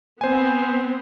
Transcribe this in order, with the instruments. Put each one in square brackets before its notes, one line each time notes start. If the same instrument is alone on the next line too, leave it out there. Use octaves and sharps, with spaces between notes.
[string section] B3 C4 [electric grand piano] C5 G#5